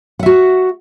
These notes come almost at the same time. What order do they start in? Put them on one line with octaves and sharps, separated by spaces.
F#5 E5 F#4